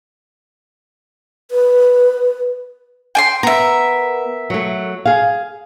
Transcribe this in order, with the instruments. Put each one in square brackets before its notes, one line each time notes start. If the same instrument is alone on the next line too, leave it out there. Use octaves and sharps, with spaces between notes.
[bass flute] B4
[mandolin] G5 G#5 C6
[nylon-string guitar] B3 [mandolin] A#4 E5
[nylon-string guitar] F#3 A3
G#4 F5